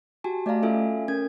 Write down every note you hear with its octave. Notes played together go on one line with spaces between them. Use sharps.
F#4 G4 G#5 A5
A3 D5 D#5 F5 A#5
C#4 F4 A4 E5 F5 G#5
C#4 A#4 G#6